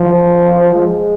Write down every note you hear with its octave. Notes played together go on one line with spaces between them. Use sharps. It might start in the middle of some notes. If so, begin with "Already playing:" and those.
Already playing: F3
G#3